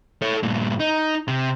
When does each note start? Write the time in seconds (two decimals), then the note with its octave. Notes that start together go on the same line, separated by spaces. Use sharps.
0.22 A4 C#5
0.43 G2 A#2
0.80 D#4
1.28 C3